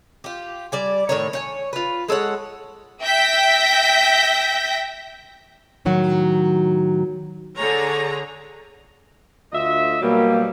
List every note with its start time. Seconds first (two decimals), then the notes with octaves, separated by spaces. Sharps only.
0.24 F4 G4
0.72 G3 D5 G#5
1.09 A2 D#3 C#5
1.33 C#5 G5 G#5
1.73 F4 B4
2.09 G#3 A4 C#5 F#5
3.02 E5 G5 G6 A#6 B6
5.85 A2 D#3 F#3 F#4
7.55 D3 G#4 C#5 A#5
9.53 D2 F4 D#5 E5
10.02 B2 F#3 G3 A#3